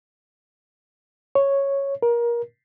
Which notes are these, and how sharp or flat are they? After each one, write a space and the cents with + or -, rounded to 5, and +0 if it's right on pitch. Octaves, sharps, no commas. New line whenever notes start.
C#5 -5
A#4 +25